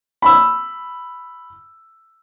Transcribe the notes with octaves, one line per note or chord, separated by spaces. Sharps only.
B5 E6